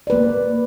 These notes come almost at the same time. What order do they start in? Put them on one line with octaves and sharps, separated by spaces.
D5 B4 A#3